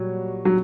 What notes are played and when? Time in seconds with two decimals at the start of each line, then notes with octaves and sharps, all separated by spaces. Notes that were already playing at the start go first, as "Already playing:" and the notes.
Already playing: A#2 F#3 G3 F#4 C#5
0.45 F#3